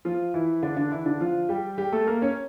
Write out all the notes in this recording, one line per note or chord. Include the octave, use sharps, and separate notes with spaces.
F3 F4
E3 E4
D3 D4
D3 D4
E3 E4
D3 D4
F3 F4
G3 G4
G3 G4
A3 A4
A#3 A#4
C#4 C#5